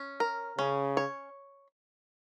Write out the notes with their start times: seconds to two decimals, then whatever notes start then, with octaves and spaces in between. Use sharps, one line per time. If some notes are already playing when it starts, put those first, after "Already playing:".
Already playing: C#4
0.20 A#4
0.58 C#3 C#4
0.97 C#5